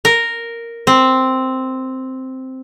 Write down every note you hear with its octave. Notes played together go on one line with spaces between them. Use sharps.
A#4
C4